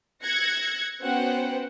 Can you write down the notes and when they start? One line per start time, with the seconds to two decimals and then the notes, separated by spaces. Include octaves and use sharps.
0.23 E6 F#6 G#6 A#6 C#7
1.02 B3 C#4 F#4 C5 F#5 G5